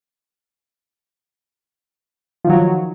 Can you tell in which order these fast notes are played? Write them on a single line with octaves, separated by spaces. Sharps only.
F3 D#3 F#3